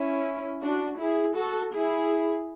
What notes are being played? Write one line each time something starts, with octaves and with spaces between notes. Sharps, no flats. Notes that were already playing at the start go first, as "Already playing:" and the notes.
Already playing: C#4 E4
D4 F#4
E4 G#4
F#4 A4
E4 G#4